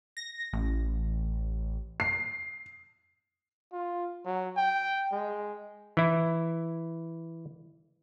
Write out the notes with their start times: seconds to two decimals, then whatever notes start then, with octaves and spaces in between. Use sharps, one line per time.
0.17 A#6
0.53 A1
2.00 C7
3.72 F4
4.25 F#3
4.57 G5
5.12 G#3
5.97 E3 E4